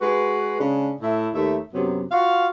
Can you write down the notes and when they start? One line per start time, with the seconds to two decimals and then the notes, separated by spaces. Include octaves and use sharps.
0.01 G#3 F#4 B4
0.59 C#3 G#3 D4
1.01 A2 E4 E5
1.34 D#2 A3 E5
1.73 F#2 C3 F#3 B3
2.12 F4 F#4 F5